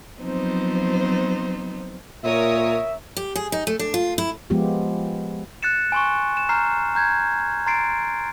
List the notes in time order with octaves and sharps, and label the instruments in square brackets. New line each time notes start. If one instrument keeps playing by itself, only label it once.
[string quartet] F3 F#3 B3 C4 D#4 C5
[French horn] A#2 [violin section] A#4 C#5 D#6 [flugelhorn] E5
[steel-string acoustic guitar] G4
G#4
D#4
A3
D4
F4
E4
[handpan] F3 G#3 B3 F4 G4
[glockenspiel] F#6 A6 C#7 E7
G#5 C6 C#6
E7
A#5 F6 G6 C7
A#5 G6 G#6
A#5 C6 A6 C7 D7